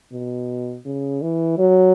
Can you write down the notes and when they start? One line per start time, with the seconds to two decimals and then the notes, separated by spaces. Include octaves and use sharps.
0.12 B2
0.85 C#3
1.22 E3
1.59 F#3